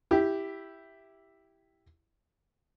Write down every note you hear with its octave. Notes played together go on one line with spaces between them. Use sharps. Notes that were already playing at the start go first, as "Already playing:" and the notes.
E4 G4